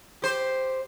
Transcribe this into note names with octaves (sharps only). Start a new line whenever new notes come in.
G4 C5